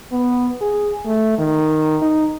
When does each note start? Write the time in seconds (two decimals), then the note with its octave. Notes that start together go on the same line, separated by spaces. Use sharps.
0.12 B3
0.61 G#4
1.05 A3
1.38 D#3
2.02 D#4